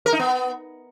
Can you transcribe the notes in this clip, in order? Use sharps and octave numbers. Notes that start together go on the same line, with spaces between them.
A#4
D#4
B3